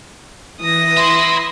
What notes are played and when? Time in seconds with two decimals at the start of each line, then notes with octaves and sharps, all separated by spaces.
0.61 E3 D#6 A#6
0.97 E5 B5 C6